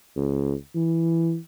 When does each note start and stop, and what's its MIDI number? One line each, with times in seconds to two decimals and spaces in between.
0.16 0.53 37
0.75 1.37 52